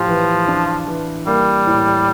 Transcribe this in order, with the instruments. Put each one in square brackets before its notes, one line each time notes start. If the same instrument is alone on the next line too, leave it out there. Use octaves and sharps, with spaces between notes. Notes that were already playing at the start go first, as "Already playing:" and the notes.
Already playing: [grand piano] A2 G4 [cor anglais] F3
[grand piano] E3
D4
E3
[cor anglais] G3 [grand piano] A#3
[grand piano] A2